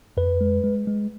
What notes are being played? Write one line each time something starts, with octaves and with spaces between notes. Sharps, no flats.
F2 B4
G#3
G#3
G#3